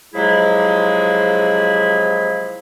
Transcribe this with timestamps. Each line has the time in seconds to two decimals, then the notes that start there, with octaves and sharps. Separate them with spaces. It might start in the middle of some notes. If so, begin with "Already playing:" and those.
0.14 C3 F3 F#3 G#3 E4 G#4